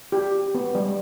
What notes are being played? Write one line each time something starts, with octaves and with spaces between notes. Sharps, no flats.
G4
B3
G3